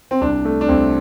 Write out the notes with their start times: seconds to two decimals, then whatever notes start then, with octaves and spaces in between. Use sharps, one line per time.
0.11 C4
0.21 C2 D4
0.45 A3
0.61 D4
0.68 C2 C4